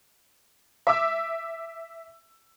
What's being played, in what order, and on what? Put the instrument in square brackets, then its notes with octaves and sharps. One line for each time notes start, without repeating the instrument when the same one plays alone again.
[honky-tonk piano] E5 D6 E6